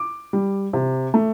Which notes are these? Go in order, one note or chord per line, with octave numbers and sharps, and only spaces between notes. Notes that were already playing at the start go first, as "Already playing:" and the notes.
Already playing: D6
G3
C3
A3